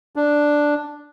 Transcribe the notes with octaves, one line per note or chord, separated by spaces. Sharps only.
D4